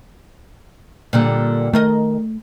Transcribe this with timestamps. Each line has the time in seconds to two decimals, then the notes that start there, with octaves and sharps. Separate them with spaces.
1.13 A#2 D3 G3
1.73 D#3 A3 A#4 D#5